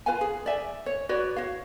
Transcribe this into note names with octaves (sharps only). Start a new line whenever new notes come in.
F4 B4 F5 G#5
G#4
D5 E5 G#5
C#5
F#4 B4 C#5 D5
F#4 C#5 F5